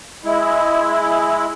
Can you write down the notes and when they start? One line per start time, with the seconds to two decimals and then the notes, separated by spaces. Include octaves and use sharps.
0.24 G#3 E4